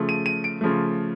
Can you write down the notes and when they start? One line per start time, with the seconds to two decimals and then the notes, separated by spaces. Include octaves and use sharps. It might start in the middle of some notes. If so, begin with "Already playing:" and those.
Already playing: C#3 F3 A3
0.09 D#7
0.26 D#7
0.44 D7
0.61 C#3 F3 A3